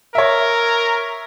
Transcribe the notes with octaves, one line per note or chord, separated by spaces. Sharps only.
A#4 C#5 E5